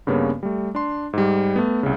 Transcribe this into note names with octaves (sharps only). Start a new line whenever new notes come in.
G2 C#3 A#3 B3 C#4
G3 A3
D4 C6
G#2 G3
A3 B3
C2 C#3